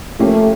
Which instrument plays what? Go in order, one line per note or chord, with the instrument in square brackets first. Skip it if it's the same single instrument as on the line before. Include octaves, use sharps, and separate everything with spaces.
[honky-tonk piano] F3 A#3 C#4 G4 [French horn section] A3